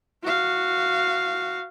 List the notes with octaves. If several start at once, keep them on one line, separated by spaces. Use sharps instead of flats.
F#4 F5